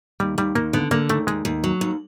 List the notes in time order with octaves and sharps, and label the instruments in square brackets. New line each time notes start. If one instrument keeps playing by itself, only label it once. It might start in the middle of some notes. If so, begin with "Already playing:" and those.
[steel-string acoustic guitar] D#2 [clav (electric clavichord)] G3
[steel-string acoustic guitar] D#2 [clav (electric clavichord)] G3
[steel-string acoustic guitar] D#2 [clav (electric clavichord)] A#3
[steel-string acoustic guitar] D3 [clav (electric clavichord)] B3
[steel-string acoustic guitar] D3 [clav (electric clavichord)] A#3
[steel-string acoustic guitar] D#2 [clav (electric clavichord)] A3
[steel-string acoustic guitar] D#2 [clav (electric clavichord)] G#3
[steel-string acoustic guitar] D#2
F#3
D#2